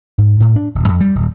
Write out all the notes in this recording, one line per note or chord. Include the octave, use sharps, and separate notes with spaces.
G#2
A2
D4
D#1
F2
G3
D#1